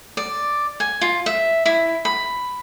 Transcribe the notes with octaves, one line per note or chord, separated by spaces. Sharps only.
D5
G#5
F4
E5
E4
B5